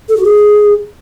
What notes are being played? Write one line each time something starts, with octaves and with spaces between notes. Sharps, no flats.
A4
F#4
G#4